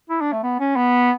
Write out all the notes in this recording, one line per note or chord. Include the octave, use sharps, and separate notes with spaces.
E4
D4
A3
B3
C#4
B3